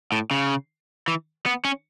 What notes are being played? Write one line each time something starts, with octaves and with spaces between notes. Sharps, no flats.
A2
C#3
E3
B3
C#4